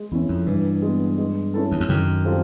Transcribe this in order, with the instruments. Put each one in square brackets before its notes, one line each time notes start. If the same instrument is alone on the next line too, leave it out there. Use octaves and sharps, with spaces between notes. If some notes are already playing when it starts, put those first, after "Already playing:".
Already playing: [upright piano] G#3
[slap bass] E2 [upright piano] C#4 E4
[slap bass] F2
[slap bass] G2 [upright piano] E3
[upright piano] G#3 B3
G#3
C#4 E4 A4
[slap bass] E2
F2
[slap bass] F#2 [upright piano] D#3
[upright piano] G3 C4 F4 A4